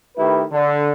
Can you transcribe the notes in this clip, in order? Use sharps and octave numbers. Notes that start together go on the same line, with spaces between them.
D#3 A3 E4 G4 B4
D3